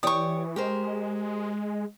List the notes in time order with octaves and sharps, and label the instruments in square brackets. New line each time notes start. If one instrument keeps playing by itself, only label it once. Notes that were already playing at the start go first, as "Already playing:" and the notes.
[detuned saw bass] E3 [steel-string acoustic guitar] G4 C#5 D5 [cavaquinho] C#6 D#6
[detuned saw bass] G#3 [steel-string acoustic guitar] G4 A#4 C5